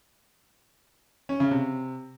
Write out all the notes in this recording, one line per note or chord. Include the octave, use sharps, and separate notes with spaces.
C#4
C#3
C3